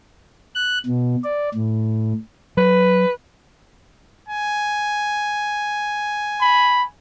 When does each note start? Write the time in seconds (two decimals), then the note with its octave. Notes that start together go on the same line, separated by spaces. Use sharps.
0.55 F#6
0.86 B2
1.24 D5
1.54 A2
2.57 F#3 B4
4.28 G#5
6.41 B5